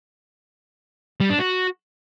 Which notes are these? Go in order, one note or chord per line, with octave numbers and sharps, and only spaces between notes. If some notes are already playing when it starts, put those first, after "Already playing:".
G3
D4
F#4